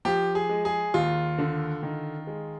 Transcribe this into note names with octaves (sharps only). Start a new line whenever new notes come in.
F3 G4
G#4
G#3
G#4
D#2 F4
D3
D#3
G#3